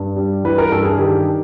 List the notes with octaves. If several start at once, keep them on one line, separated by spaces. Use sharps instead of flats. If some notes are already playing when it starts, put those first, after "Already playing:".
Already playing: G2
G3
E3 B4
A#4
G2 A4
G#4
D#3 G4